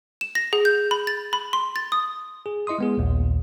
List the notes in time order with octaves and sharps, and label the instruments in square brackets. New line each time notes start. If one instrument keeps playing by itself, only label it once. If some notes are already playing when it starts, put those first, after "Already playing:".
[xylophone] E7
A#6
G#4
G6
B5
A6
B5
C6
A6
D#6
[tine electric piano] G#4
E4 D#5 C6 D#6
G#3 B3 G#4
A#1 D#2 A#2